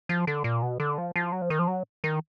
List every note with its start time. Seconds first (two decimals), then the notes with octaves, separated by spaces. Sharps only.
0.09 F3
0.27 D3
0.44 A#2
0.62 B2
0.80 D3
0.98 F3
1.16 F3
1.32 F#3
1.42 F3
1.50 D#3
1.59 F3
1.67 F#3
2.04 D#3